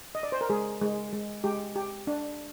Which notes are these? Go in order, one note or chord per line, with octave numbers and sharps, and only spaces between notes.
D#5
D5
C5
A#4
G#3 G#4
G#3
G#3
G#3 G4
G4
D4